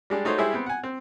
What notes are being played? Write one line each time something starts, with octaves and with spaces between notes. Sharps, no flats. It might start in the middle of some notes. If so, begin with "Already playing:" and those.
G3 G#3 D4
A3 D#4 F#4 C5 C#5
G3 G#3 E4 G#4 C5 E5
B3 C4
F#5 G#5
C4